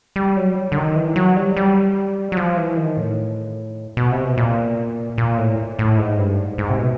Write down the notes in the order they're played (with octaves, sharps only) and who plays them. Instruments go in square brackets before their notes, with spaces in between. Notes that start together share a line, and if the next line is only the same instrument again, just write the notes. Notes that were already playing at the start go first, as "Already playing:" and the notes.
[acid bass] G3
F#3
D3
D#3
E3
F#3
G3
G3
F#3
F3
E3
D#3
A2
B2
C3
B2
A#2
A#2
A2
A2
G#2
G2
G#2
G#2
C3
B2